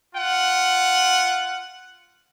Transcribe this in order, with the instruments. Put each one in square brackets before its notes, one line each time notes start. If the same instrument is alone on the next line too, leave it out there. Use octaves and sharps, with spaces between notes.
[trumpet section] F4 F#5